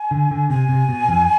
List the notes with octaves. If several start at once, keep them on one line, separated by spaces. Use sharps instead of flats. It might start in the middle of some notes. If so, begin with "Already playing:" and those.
Already playing: G#5
D3
D3
C3 G#5
C3
B2
F2